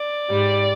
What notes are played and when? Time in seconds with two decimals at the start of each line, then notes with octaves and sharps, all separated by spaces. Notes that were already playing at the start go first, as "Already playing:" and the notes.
Already playing: D5
0.29 G#2 G3